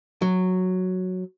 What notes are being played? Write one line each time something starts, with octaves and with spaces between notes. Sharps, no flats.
F#3